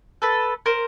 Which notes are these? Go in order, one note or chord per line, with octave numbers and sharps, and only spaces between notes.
A4 B4
A#4 C5